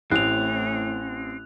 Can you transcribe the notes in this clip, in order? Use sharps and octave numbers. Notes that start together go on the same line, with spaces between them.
A1 A2 C4 F#6 F7